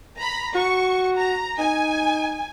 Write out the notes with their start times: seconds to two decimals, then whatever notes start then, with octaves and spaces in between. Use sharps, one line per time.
0.17 A#5 B5
0.55 F#4 C#6
1.17 A#5
1.59 D#4 G#5